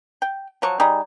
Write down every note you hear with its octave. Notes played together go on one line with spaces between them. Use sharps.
G5
F3 F#3 C#6
G3 D#4 G#4